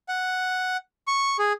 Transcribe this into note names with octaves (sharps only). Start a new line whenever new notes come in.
F#5
C#6
G#4